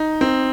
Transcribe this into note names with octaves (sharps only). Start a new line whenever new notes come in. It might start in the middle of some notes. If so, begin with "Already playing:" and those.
Already playing: D#4
C4